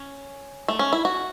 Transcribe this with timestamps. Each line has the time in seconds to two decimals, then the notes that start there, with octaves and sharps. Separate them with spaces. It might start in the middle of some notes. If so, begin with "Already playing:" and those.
Already playing: C#4
0.68 A3
0.79 C#4
0.93 E4
1.05 F#4